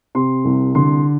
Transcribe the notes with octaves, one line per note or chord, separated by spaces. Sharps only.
C3 C6
C2
D3 C6